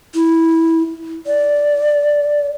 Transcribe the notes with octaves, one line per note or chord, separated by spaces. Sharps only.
E4
D5